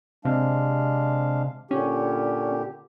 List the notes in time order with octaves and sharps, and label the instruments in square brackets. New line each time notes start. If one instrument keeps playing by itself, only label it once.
[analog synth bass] C3 [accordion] G#3 D4 F5
[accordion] A#2 D3 G4 [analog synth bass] C#4